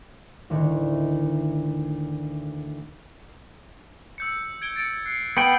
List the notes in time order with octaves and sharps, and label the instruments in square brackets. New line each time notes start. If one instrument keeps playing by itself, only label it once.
[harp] D2 A2 D#3
[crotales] E6 G6 C#7
G#6 D7 G7
A6 C#7 D7
F#6 C7 C#7
[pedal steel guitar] B3 G5 [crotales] C#7 D7 F#7